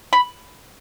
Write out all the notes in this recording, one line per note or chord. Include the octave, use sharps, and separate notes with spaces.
B5